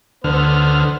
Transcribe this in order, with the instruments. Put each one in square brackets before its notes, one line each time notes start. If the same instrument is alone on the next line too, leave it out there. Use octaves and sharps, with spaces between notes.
[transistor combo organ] D2 D3 F6 [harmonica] B3 C5